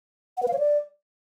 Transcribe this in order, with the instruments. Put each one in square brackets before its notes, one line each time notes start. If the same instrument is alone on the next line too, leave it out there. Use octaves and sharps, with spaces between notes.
[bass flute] F#5
B4
F5
C#5
D5